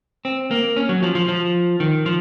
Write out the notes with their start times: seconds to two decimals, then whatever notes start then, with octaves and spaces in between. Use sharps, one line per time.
0.25 C4
0.51 A#3
0.77 C#4
0.89 F#3
1.03 F3
1.15 F3
1.29 F3
1.80 D#3
2.06 F3